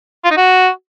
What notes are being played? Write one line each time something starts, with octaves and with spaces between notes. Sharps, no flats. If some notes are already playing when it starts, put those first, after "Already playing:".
F4
D#4
F#4